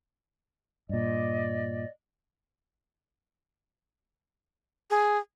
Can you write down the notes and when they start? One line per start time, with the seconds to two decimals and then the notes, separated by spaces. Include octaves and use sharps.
0.89 G2 A#2 D5 D#5
4.90 G#4